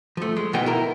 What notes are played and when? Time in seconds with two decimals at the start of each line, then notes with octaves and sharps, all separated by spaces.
0.17 F3 A3
0.37 G#3
0.53 B2 E3 B3 D#4 D#5 G5
0.66 E4 A#4